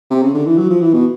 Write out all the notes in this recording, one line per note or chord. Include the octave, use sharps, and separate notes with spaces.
C3
C#3
D3
E3
F#3
F3
E3
B2